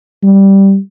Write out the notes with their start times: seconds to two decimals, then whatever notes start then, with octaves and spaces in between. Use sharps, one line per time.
0.23 G3